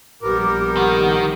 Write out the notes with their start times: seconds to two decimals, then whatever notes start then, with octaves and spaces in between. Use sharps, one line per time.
0.22 A#1 G3 B3 A#4 D6
0.77 D#3 F#5